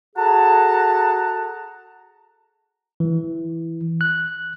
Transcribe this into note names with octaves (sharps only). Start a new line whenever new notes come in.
F#4 G#4 A4 F#5 A5 A#5
E3
F#6